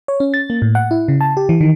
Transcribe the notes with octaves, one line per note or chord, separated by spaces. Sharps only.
C#5
C#4
A6
A#3
A2
F#5
E4
C#3
A5
G4
E3
D#3